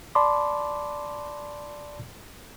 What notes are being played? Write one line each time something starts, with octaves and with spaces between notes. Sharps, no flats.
D5 A5 B5 C6 D6